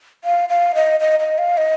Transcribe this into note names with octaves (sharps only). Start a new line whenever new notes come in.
F5
F5
D#5
D#5
D#5
F5
D#5